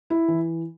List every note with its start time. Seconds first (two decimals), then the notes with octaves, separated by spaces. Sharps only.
0.10 E4
0.28 E3